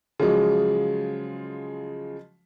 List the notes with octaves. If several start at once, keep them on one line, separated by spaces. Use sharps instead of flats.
C#3 F3 F#3 G#3